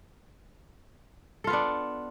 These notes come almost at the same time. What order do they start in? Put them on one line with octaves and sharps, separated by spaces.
A4 F4 B3 D4